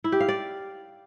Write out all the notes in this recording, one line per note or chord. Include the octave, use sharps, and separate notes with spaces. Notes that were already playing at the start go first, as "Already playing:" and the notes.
E4
G4
F5
D5